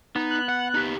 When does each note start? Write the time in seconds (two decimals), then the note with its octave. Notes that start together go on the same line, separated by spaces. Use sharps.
0.16 B3 D#4
0.31 F#6
0.49 F#5
0.75 D#4 G4